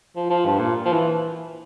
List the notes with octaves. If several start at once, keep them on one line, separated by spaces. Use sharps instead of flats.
F3
F3
G2
A#2
F3
E3